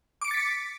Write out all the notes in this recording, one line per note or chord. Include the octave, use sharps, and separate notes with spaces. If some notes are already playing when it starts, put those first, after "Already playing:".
D6 A6 B6 C#7 D7